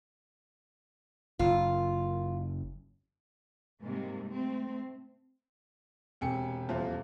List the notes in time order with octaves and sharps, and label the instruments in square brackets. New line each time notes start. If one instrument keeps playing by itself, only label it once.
[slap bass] F#1 [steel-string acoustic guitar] F4
[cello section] G#2 C3 G3 G#3 A#3
A3 C4
[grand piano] E1 C3 G5 G#5 C#7
D#1 E2 F3 F4 C5 E5